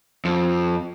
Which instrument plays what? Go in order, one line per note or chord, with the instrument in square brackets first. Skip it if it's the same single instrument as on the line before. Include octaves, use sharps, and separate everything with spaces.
[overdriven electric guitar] F2